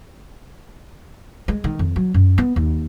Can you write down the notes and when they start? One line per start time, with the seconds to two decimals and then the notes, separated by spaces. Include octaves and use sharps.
1.48 G#3
1.64 D#3
1.79 F2
1.96 F#3
2.14 F#2
2.38 B3
2.56 D#2